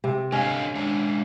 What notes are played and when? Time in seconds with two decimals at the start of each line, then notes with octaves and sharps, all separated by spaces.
0.04 C3
0.32 D3 C#4 D#5 F5
0.75 G#3 D4 E5